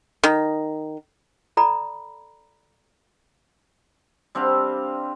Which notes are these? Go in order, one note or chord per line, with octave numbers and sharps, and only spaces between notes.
D#3
A4 D5 A#5 B5
G3 C4 D4 F5